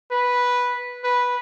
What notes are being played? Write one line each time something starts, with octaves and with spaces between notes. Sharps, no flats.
B4
B4